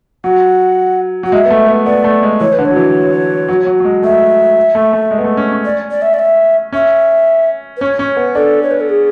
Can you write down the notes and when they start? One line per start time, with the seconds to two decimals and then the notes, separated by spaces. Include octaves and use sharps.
0.24 F#3 F#5
1.23 F#3 F#5
1.32 G#3 E5
1.45 B3
1.51 A3
1.68 B3
1.86 B3 D5
2.04 A3
2.23 G#3
2.40 E3 C#5
2.52 B4
2.59 D3
2.65 C#5
2.71 F#3
2.76 E3
3.49 F#3
3.66 F#3
3.80 F#3
3.84 G#3
4.02 A3 E5
4.75 A3
4.93 A3
5.11 G#3
5.19 B3
5.24 A3
5.37 C#4
5.52 C#4
5.64 D5
5.90 D5
6.01 E5
6.13 D5
6.19 E5
6.73 C#4 E5
7.76 B4
7.80 C#4 C#5
7.99 C#4
8.17 B3
8.35 D4 A4
8.62 C#5
8.70 B4
8.80 A4
8.89 G#4